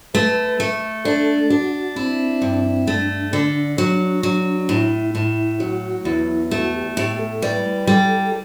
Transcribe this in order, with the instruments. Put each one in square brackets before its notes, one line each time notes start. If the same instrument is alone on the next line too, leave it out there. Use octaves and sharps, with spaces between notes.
[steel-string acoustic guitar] A3 [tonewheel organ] B4
[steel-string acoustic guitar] A3
[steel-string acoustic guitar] D4 [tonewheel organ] A4
[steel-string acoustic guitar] D4 [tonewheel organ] F#4
[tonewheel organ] C4 [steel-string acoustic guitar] E4
[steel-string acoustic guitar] G2
[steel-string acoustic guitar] A3 [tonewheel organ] D4
[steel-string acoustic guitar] D3
F#3
F#3
[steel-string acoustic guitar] A2 [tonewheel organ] E4
[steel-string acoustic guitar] A2 [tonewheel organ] E4
[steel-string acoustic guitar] F#3 [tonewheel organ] F#4
[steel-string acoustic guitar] E2 [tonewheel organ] E4
[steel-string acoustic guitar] A3 [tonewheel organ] F#4
[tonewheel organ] G4
[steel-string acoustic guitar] A2 [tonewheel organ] G4
[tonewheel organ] A4
[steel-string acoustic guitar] G3 [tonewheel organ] B4
[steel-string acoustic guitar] G3 [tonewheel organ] A4